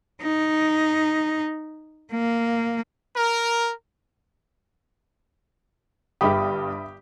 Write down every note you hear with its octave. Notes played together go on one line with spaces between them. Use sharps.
D#4
A#3
A#4
G1 G2 G4 E5 B5 D#6